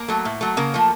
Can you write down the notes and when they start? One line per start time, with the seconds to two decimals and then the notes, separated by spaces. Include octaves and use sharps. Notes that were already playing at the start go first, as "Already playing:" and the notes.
Already playing: A#3 A#4
0.08 F#3 A3
0.25 A2
0.41 F#3 A3
0.57 C#3 A#3 A#4
0.74 F3 A3